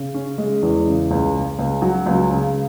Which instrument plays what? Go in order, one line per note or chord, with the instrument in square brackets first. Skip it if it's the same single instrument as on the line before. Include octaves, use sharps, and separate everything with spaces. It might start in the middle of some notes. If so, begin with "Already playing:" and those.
Already playing: [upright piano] C#3
C#4
G#3
E2
C#3
C#2
C#3
C#2
F#3
C#2
C#3